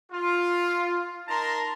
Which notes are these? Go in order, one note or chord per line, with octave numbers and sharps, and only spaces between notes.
F4
D#4 A#4 A5 A#5 C6